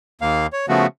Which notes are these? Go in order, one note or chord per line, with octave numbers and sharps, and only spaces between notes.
D#2 A#3 F5
C#5
C#3 F3 A3 B3 F#4